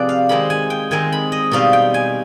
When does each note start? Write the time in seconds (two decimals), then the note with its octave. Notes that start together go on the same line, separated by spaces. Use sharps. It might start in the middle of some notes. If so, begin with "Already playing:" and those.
Already playing: C3 F3 C4 G#4 B4 D5
0.09 F5
0.29 D#3 G#3 C4 D#4 B5
0.50 G#5
0.70 G5
0.91 D#3 G#3 C4 D#4 G#5
1.12 B5
1.32 D#5
1.51 B2 G3 C4 D#4 F5
1.73 G5
1.94 G#5